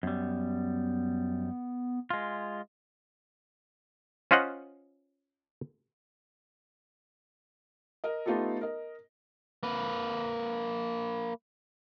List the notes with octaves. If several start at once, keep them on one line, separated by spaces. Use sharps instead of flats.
F#2 G3 B3
G#3 F4
C#4 F4 C5 D#5 F#5
A#4 D#5
A3 B3 D#4 F4 G4 A4
A#4 D#5
A#3 B4